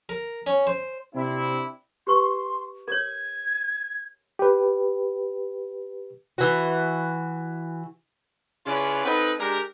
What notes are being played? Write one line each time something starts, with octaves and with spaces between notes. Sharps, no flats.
A#4
C#4
C5
C3 C4 D4 E4
G4 B4 C6 C#6
A#4 C#5 G#6
G4 B4
E3 F#4
C#3 C#4 E4 F4 B4 D5
C4 D#4 A4 B4
G#3 D4 G4 A#4